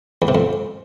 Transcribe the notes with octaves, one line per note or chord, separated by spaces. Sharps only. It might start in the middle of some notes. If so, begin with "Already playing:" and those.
E2
C3
F2